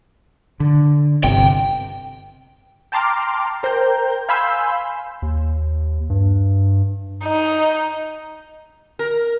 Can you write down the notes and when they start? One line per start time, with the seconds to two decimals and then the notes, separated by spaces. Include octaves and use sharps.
0.60 D3
1.24 G1 C3 G5
2.92 G5 A5 A#5 C6 D6 F6
3.63 A#4 C5 G5 A#5 G6
4.29 F5 G#5 B5 C6 E6 G6
5.22 D#2
6.10 G2
7.24 D#4
8.99 A#4